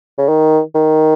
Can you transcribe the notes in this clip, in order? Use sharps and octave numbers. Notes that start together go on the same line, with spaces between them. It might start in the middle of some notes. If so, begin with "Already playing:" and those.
C#3
D#3
D#3